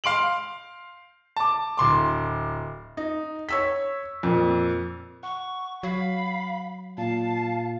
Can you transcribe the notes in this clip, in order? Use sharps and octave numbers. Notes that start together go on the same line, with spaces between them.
F5 C6 D7 F#7
A5 D6
D1 C6 D6
D#4
C#5 E6 B6
F2 A#2
F#5 C#6
F#3 F5 B5
A#2 F5 A5